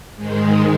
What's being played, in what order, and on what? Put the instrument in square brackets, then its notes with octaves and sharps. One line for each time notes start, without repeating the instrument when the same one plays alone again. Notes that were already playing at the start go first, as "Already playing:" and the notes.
[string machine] G#2 D#3 G#3